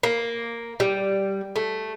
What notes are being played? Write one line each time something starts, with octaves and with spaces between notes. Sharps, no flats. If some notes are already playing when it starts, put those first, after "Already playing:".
A#3
G3
A3